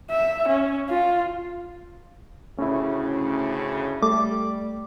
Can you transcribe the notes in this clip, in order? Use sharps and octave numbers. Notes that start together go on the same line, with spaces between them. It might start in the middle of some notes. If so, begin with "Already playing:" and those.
E5
C#4
F4
D2 A2 C#3 C#4 E4
G3 A3 D6